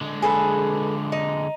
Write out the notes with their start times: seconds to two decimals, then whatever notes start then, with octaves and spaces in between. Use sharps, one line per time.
0.01 D3 G#3
0.22 G#4 A4 B4
1.12 D#4